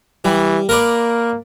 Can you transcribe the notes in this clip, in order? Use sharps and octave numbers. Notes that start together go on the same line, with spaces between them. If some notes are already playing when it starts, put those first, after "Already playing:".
E3 G3
A#3 A#4 B4 D5